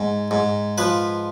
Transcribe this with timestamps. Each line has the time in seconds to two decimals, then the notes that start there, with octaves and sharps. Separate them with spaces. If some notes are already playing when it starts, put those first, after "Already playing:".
Already playing: G#2
0.31 G#2
0.78 F3 B4